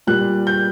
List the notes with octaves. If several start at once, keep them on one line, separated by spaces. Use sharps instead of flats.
A#2 G3 F#6
G6